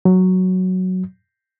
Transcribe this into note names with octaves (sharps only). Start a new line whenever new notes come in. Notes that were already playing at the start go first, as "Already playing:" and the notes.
F#3